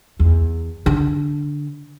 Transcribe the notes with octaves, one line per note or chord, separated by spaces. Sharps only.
E2
D3